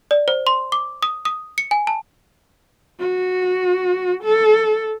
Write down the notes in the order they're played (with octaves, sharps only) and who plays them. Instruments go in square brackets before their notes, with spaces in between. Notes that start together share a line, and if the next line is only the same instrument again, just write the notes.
[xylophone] D5
C5
C6
D6
D#6
D#6
C#7
G#5
A5
[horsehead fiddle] F#4
A4